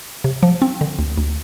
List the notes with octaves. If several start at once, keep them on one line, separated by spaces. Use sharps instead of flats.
C3
F3
C4
D3
D2
D2